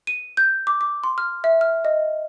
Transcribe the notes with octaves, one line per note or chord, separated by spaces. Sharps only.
D#7
G6
D6
D6
C6
F6
E5
F6
D#5